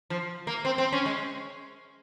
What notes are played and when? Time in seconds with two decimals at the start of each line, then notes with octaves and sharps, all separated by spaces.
0.10 F3
0.47 A#3
0.65 C4
0.78 C4
0.92 C#4
1.06 G#3